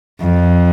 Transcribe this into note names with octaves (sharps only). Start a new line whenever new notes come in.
F2